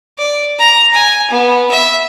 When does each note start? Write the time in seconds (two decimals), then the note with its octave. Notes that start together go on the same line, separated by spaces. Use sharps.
0.18 D5
0.58 A#5
0.93 G#5
1.30 B3
1.71 E5